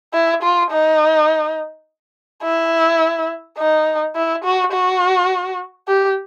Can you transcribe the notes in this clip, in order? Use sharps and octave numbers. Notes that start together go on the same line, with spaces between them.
E4
F4
D#4
E4
D#4
E4
F#4
F#4
G4